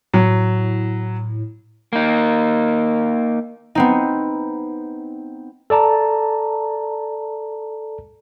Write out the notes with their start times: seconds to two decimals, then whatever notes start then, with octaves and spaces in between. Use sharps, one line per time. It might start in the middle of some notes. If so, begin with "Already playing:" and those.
0.13 A2 F#3
1.93 A#3 D#4
3.75 B3 C4 D#4
5.70 A4 D5 A5 A#5